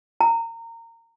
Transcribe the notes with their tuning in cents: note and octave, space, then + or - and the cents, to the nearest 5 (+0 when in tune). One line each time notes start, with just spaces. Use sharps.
A#5 -25